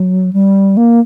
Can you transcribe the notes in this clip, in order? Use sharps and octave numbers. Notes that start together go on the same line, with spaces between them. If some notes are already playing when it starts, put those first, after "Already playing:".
Already playing: F#3
G3
A#3